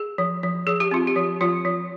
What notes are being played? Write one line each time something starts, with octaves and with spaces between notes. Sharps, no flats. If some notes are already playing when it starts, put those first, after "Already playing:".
Already playing: G#4
F3
F3
F3 G#4
G4
C4 F4
G4
F3
F3 F4
F3